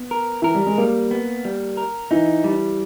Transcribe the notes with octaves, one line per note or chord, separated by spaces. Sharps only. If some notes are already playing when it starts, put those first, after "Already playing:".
Already playing: B3
A#4
E3 A#4
G3
G#3
G3 A#3
B3
G3
A#4
E3 D#4
G3